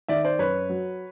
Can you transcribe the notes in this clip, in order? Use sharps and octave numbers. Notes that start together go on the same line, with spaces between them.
D#3 D5 E5
C5 D5
F#2 B4 C#5
F#3